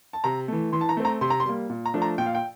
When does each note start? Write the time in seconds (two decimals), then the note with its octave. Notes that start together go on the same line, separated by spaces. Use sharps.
0.13 A5
0.24 C3 A#5
0.48 E3 A3
0.73 E3 C6
0.81 A5
0.89 A#5
0.97 A3 C4
1.05 A#5
1.21 C3 C6
1.30 A#5
1.40 C6
1.45 G3 A#3
1.70 A#2
1.86 A#5
1.94 F3 A3 D4
2.02 A#5
2.18 A#2 G5
2.25 F5
2.35 G5